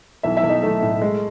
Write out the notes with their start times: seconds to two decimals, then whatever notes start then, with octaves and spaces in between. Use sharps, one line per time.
0.23 B1 E4 E5
0.37 E4 E5
0.43 B1
0.49 D#4 D#5
0.62 B1 A3 A4
0.82 A2
1.01 G#3